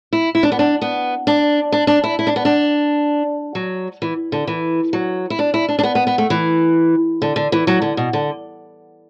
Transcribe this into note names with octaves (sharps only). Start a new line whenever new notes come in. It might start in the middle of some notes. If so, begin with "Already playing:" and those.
E4
E4
D4
B3
D4
B3
D4
D4
D4
E4
E4
D4
B3
D4
F#3
E3
D3
E3
F#3
E4
D4
E4
D4
D4
B3
B3
B3
A3
E3
D3
D3
E3
F#3
D3
B2
D3